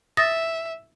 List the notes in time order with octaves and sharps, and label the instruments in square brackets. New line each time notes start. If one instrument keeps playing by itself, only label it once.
[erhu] E5 [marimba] D#6 A6 A#6